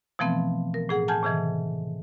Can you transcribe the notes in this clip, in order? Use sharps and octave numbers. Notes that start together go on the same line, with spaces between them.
B2 E3 F3 A3 B3 C4
A#4
A2 G#4 F#5
F#5 G#5 A5 F6 G6 G#6
A2 C3 D#3 E3